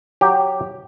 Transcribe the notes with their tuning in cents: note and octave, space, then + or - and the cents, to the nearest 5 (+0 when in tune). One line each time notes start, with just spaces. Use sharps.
F#3 +0 G4 +0